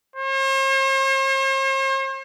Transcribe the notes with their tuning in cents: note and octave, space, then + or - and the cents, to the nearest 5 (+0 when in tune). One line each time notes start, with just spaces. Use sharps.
C5 +45